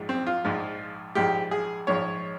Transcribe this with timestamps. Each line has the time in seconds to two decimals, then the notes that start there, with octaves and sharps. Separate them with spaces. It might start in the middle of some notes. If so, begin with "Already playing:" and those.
Already playing: A#1 G#2 F3 G#3
0.09 C4
0.27 F4
0.44 A#1 G#2 F3 G#3
1.15 A#1 G#2 F3 G#3 G4
1.51 G#4
1.87 A#1 G#2 F3 G#3 C#5